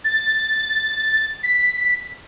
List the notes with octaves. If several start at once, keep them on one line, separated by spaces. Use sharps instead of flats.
A6
B6